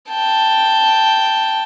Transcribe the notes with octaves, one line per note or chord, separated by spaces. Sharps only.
G5 A5